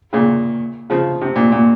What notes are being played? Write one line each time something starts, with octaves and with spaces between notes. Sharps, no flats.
A#2 C#3
C#3 F3
C3
A#2
A#2